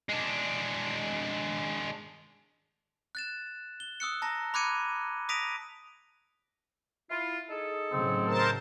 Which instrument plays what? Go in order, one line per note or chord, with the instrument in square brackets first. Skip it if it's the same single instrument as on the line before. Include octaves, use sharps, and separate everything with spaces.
[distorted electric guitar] G#3 D4
[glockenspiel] F#6 A6 E7
G7
D#6 E6 F#6 C#7
A5 A#5 A#6
B5 D6 F#6 G#6 C#7 D#7
D#6 A#6 B6 D7 D#7 F7
[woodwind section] E4 F4
D#4 G#4 A4
[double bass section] A2 C#3 F#3 [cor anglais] C4
[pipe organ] A#4 C5 A5